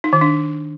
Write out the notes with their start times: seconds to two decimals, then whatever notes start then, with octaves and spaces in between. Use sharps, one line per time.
0.04 D#4
0.13 D#3
0.21 D4